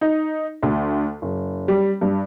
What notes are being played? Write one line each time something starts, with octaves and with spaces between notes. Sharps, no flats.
D#4
D2
F#1
G3
G2